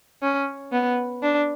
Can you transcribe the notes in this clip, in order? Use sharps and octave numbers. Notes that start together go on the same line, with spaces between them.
C#4
B3
D4